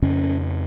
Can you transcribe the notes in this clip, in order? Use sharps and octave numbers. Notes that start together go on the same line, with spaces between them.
F2 C#3 C#4